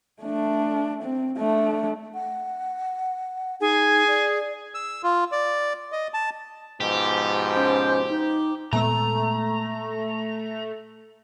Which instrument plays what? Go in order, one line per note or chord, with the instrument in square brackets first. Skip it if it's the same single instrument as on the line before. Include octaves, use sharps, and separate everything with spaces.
[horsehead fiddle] A3 D4
C4
A3 D4
[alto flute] F#5
[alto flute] D#4 [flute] G#4 [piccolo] G#5
[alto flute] D5
[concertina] E6
F4
D5
D#5
A5
[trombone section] G#2 B2 F3 [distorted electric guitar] G4
[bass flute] C#4 [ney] C5
[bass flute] D#4
[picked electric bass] A#2 G#3 B3 [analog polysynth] A3 [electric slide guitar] A#5